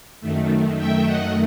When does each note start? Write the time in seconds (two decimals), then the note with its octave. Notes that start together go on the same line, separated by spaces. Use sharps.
0.21 F#2 D#3 A3
0.77 E5 G5
1.05 D#5 F#5